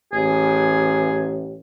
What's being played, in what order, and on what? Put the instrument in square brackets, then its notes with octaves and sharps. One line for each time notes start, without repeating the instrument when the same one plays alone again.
[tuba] A1 [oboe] G#4